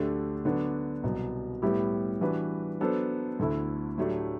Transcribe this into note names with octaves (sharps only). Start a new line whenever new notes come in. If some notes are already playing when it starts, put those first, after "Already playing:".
Already playing: D2 D3 A3 D4 G4
D3 F#3 B3 D4 F#4
C2 B2 F#3
A2 G3 B3 E4 G4
E3 G3 D4 F#4 B4
F#3 B3 D4 A4 C5
D2 D3 A3 E4
A2 F#3 A3 D4 G4